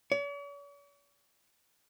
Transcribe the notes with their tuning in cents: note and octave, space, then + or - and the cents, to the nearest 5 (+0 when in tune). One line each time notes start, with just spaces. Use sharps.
C#5 +45